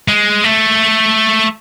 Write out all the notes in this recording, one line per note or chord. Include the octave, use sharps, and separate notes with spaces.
G#3
A3